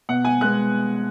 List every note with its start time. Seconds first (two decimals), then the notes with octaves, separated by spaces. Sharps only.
0.09 B2 F#5
0.25 G#5
0.41 G#3 B3 F#6